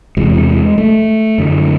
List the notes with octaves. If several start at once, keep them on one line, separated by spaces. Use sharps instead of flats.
E2 C3 G#3
A3
F#2 D3